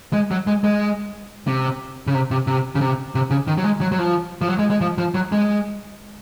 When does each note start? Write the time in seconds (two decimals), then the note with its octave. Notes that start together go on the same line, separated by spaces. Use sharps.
0.13 G#3
0.31 F#3
0.47 G#3
0.64 G#3
1.47 C3
2.07 C#3
2.14 C3
2.31 C3
2.47 C3
2.75 C#3
2.81 C3
3.15 C3
3.31 C#3
3.47 D#3
3.58 F#3
3.64 G#3
3.81 F#3
3.92 F#3
3.99 F3
4.41 F3
4.48 F#3
4.59 G#3
4.70 G#3
4.81 F3
4.98 F3
5.14 F#3
5.32 G#3